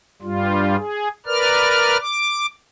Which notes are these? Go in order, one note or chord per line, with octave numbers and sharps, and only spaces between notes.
G2 G3 F4
G#4
A#4 B4 D5 F6
D6